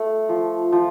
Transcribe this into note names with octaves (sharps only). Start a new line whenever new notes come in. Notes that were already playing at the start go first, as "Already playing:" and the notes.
Already playing: A3
F3
F3